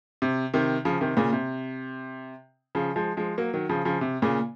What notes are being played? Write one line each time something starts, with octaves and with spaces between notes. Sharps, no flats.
C3
C3 D#3
C#3 F3
C3 D#3
A#2 C#3
C3
C#3 F3
F3 G#3
F3 G#3
F#3 A#3
D#3 F#3
C#3 F3
C#3 F3
C3
A#2 C#3